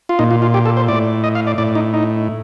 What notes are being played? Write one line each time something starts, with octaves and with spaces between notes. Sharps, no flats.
F4
A#2 D#4
F4
F4
G4
A4
C5
A2 D5
D#5
F5
D5
A2 D5
D#4
D#4